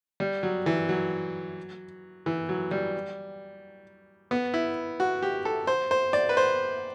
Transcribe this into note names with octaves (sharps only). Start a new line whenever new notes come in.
G3
F#3
E3
F#3
E3
F#3
G3
B3
E4
F#4
G4
A4
C5
C5
D5
B4
C5